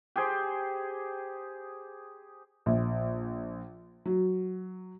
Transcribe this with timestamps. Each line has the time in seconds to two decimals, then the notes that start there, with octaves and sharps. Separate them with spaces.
0.16 G4 G#4 C5
2.66 A#1
4.06 F#3